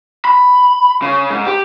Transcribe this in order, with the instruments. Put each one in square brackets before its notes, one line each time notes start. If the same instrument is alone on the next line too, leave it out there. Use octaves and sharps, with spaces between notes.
[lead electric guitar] B5
C#3
G#2
G4